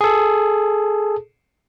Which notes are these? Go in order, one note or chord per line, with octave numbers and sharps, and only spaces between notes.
G#4 A4